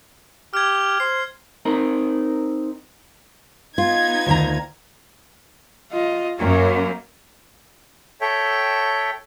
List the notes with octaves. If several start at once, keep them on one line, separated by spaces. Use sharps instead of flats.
G4 F6 G#6
C5 C7
C4 D#4 A#4
B3 D#4 F4 G#6
D2 D#3 A#5
F4 D#5
F#2 A#3 A#4
A4 C#5 E5 G5